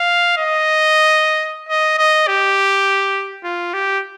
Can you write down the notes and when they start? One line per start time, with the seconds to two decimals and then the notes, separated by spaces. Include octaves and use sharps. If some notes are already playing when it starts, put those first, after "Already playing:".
Already playing: F5
0.37 D#5
1.69 D#5
1.98 D#5
2.28 G4
3.44 F4
3.73 G4